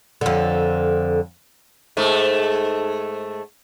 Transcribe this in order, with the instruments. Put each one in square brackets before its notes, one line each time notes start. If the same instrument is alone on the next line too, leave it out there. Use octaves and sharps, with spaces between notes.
[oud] F2 D3
[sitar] G#2 A3